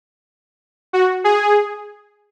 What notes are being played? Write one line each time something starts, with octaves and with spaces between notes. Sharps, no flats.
F#4
G#4